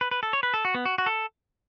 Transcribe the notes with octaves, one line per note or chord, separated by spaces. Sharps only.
B4
B4
A4
C#5
B4
A4
F#4
B3
F#4
F#4
A4